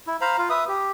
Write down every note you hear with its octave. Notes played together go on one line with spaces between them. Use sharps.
E4
C5 F5 A#5 B5
F4 F5
B4 E5 D#6
G4